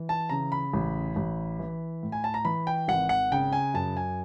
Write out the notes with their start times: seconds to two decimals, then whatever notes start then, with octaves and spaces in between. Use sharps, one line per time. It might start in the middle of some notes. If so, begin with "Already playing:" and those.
Already playing: E3
0.09 A5
0.29 C#3 A#5
0.52 B5
0.73 A1
1.16 A1
1.59 E3
2.03 A2
2.12 G#5
2.24 A5
2.34 A#5
2.45 E3 B5
2.67 G5
2.88 G#1 F#5
3.09 F#5
3.32 C#3 G5
3.53 G#5
3.74 F#2 A5
3.97 G#5